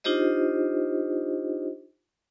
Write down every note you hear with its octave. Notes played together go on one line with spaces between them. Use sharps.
D4 D#4 F4 G4 C5 D#5